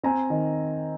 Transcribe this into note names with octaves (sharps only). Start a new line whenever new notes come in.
C4 G#5 A#5
D#3